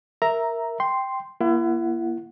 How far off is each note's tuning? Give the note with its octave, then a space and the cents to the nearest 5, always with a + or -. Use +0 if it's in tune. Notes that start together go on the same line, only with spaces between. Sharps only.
A#4 +0 E5 +0 A#5 +0
G5 +0 C6 +0
A#3 +25 E4 +35 F#5 +0